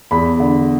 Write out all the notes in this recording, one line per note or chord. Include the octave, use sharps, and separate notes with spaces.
E2 B5
D3